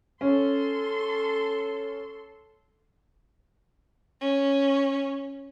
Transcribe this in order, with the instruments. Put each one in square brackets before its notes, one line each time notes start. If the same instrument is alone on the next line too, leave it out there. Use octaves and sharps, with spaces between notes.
[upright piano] C#4 [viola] A4 C6
[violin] C#4